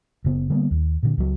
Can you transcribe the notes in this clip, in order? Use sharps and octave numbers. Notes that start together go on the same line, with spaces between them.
F#1 C#3 B3
D3 G3 A#3 B3
D#2
A#2 D3
C#2 F#3